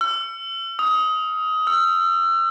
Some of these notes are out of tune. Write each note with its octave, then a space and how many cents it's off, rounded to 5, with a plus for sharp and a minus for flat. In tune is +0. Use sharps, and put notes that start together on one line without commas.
E6 +45
D#6 +25
E6 +40